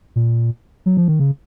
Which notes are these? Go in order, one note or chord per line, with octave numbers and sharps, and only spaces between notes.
A#2
F#3
F3
D#3
C#3